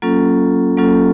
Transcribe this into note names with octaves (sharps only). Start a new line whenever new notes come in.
F#3 A#3 C#4 F4 A4
F#3 A#3 C#4 F4 A4